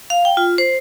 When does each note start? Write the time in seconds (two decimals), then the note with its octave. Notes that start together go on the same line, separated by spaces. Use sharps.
0.10 F5
0.25 G5
0.37 F4
0.58 C5